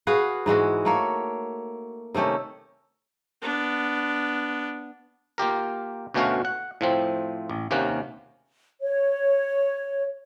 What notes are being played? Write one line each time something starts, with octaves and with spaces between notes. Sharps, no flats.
F#4 G#4 B4 F5
G#2 E3 G#3 F#4
A3 A#3 C#5
C3 D#3 A3 C#4
B3 D4
A#3 F4 G4 A#4
D2 B2 A3 C#4 F#4 F5
F#5
A2 F3 C4
A1
D#2 C3 A#3 C#4 F#5
C#5